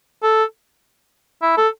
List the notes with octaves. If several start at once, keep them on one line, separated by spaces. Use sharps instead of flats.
A4
E4
A4